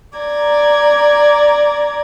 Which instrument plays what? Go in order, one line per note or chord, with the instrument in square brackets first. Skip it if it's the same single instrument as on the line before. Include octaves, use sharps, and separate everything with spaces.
[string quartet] D5 A#5 G#6